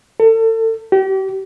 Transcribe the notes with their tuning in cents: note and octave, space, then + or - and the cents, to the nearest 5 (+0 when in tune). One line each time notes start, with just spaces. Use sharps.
A4 +35
G4 -35